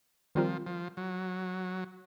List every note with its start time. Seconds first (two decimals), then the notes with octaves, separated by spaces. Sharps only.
0.35 D#3 F3 G3 C4 F4 A#4
0.66 F3
0.97 F#3